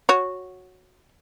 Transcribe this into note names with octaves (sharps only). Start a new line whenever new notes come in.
F#4 C#5